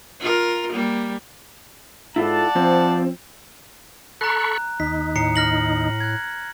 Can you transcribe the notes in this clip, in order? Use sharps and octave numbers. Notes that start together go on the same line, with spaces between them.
F4 A#4
G3 A#3
G#2 E4 F4 A4 D5 F#5 A5
F3 C4
A4 A#5 B5 C#6 F#6
D#2 D#4 B6
A2 A#5 C7 C#7
F6 A#6 F#7
F#6 G#6